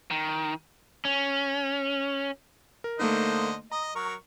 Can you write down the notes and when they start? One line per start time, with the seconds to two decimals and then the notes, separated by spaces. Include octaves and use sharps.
0.11 D#3
1.05 C#4
2.84 A#4
2.99 D3 A3 A#3 D#4 C5 D#5
3.72 D#5 A#5 D#6
3.95 F#3 A#4 C#6